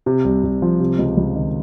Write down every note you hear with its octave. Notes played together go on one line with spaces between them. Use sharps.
C3
C2
C2
F3
C3
C#2
C#2
D#3